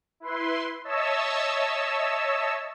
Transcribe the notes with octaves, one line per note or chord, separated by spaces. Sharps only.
E4 B4 C6
C#5 D#5 E5 A5 E6